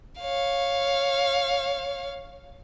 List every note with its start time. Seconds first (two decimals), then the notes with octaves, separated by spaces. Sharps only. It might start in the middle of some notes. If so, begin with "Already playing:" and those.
0.21 C#5 F5